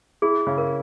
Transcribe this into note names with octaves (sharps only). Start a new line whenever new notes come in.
E4 G#4
C#3
A#4